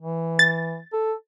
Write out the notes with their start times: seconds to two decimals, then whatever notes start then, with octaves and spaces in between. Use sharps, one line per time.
0.01 E3
0.39 A6
0.93 A4